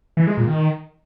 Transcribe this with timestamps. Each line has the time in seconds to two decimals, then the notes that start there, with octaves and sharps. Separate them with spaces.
0.17 E3
0.27 G#3
0.37 A#2
0.47 D#3